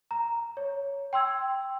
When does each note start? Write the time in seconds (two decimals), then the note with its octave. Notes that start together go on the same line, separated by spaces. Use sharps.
0.11 A#5
0.57 C#5
1.13 G5 C6 E6 G#6